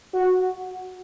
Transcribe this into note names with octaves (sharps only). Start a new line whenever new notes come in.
F#4